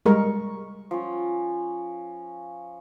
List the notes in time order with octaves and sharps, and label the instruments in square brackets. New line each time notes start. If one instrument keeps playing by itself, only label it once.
[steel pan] G3 G#3 A#4 [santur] C#6
[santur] F3 C#4